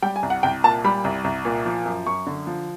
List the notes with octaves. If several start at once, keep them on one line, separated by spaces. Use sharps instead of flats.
G3 G5
G#5
C2
F#5
C2 G5
A#2 A5
G3 B5
C2
C2
A#2
F3
F#2
F#2 C#6
D3
F3